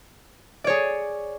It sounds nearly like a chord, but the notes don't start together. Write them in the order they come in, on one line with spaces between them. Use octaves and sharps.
D5 C#5 G#4